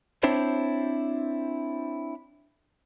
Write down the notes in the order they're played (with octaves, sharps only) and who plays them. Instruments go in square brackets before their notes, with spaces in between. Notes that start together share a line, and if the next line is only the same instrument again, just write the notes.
[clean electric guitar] C4 D4 E4 C5 C#5